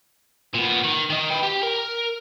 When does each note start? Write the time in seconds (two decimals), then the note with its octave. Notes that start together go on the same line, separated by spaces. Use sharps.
0.54 A#2 B3
0.84 D#3
1.10 D#3 D#4
1.30 B4 G5
1.43 G4
1.63 A#4